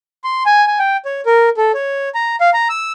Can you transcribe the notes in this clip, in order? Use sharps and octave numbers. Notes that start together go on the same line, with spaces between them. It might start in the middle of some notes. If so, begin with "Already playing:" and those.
C6
G#5
G#5
G5
C#5
A#4
A4
C#5
A#5
F5
A#5
E6